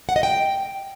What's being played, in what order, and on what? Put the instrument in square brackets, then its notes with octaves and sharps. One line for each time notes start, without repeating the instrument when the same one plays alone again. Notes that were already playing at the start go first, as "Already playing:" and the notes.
[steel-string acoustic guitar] F#5
D#5
G5